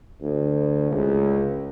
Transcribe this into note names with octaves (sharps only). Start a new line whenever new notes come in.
D2
C#2